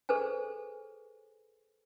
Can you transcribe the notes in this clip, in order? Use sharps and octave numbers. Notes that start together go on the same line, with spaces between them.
G#4 A4 B4 C5 G#5